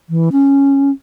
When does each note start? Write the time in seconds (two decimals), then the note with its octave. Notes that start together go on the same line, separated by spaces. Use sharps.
0.10 E3
0.32 C#4